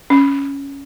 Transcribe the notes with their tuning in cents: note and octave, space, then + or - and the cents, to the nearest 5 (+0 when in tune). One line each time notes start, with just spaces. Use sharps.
C#4 +5